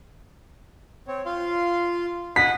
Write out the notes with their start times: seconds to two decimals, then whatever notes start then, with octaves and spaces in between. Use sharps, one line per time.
1.08 C4 C#5
1.26 F4 F5 C6
2.36 D#5 F#5 B6